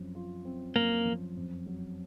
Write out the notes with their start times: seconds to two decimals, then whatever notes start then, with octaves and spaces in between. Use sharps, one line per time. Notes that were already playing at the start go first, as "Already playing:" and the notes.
Already playing: F#2 F3 C4
0.15 F4
0.45 C4
0.76 F#2 A#3
1.05 F3
1.36 F2
1.66 F#3